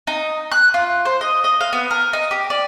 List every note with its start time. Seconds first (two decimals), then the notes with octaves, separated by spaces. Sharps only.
0.07 D#4
0.51 F#6
0.74 F4
1.05 C5
1.21 D#5
1.44 D#5
1.61 F5
1.73 B3
1.91 A#4
2.13 D#4
2.31 G4
2.50 D5